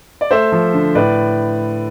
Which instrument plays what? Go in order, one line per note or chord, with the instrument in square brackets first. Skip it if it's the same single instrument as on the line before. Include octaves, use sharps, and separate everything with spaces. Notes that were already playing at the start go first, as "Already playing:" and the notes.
[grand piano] D5
A3 C5 E5
F3
D3
A2 B4 D5